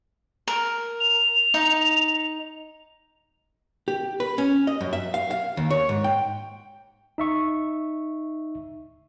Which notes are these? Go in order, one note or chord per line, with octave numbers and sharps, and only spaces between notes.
A#4
F7
D#4
G4
B4
C#4
D#5
F#2
E5
F5
F5
D#2
C#5
G#2
G5
D#4 E5 C#6